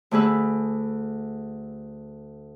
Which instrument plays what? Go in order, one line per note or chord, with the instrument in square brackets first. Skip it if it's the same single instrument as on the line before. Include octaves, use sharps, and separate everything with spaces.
[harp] D2 A3 G#4 B4 E6